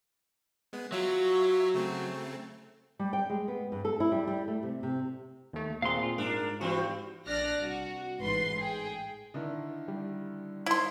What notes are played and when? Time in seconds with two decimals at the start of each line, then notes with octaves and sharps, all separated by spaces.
0.73 G#3 B3
0.92 F#3 F4 F#4 C#5 E5
1.74 C#3 A3 C4
2.99 G3
3.13 G5
3.30 G#3
3.48 B3
3.72 G2
3.85 A4
4.00 E4
4.12 G3
4.28 G3
4.48 A3
4.63 C3
4.83 C3
5.53 D#2 A3
5.82 A#2 C4 G#4 F5 C6
6.03 F4
6.18 G#2 D4 A#4
6.61 E3 G3 C4 F#4
7.26 A#1 D4 D5 F6 F#6 A#6
7.59 C2 F#4
8.21 A1 G#2 B4 C6
8.59 G#4 G5
9.34 D3 D#3 E4
9.88 G3
10.66 D#4 E4 C5 C6